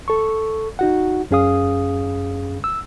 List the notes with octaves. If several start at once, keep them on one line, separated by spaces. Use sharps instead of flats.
A4 C#6
D#4 F#4 F#5
F#2 C#4 G#4 F5 D#6
E6